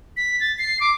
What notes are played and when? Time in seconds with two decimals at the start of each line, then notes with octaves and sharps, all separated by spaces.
0.17 B6
0.40 A6
0.58 C7
0.80 D6